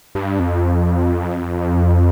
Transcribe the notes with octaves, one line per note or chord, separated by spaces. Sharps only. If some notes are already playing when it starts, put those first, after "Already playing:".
G2
F2